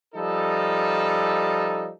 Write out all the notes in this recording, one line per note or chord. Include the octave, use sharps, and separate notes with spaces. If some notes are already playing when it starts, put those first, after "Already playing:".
F3 G3 D#4 A4